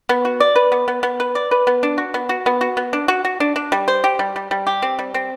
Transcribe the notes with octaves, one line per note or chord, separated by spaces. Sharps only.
B3
F#4
D5
B4
B3
B3
B3
B4
D5
B4
B3
D4
F#4
B3
F#4
B3
F#4
B3
D4
F#4
F#4
D4
D4
G3
C5
G4
G3
G3
G3
G4
C4
G3
C4